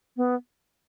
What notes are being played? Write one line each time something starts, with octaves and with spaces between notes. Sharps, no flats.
B3